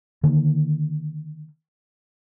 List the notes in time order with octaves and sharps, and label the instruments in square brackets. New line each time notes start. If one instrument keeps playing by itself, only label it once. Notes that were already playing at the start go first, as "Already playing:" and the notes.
[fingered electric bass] D3 D#3 A#3